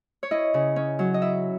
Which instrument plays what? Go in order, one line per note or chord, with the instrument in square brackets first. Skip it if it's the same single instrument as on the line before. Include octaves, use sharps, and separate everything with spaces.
[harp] C#5
E4 D#5
C#3
C#4
F#3
D#5
E4 E5